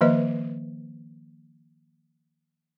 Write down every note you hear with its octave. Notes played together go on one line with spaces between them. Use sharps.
D#3 F3 A#3 B4 D#5